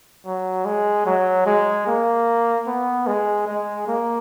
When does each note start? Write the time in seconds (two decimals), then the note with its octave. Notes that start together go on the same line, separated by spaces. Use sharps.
0.26 F#3
0.65 G#3
1.06 F#3
1.46 G#3
1.87 A#3
2.67 B3
3.07 G#3
3.47 G#3
3.88 A#3